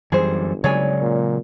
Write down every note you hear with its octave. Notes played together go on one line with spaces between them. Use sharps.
G1 F#2 E3 G3 G#4 C5
C#3 F#3 G#3 C#5 D5 G#5
A#2